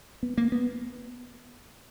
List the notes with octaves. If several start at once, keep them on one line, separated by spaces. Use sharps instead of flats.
B3
A#3
B3